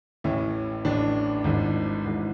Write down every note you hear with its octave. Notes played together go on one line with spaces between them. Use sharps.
A1 A2 E3 C#4 E4
A1 A2 E3 D4
G#1 G#2 E3
G#1 G#2 E3